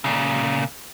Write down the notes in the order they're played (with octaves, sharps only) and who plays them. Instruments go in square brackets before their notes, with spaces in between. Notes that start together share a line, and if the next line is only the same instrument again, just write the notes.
[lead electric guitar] A#2 C#3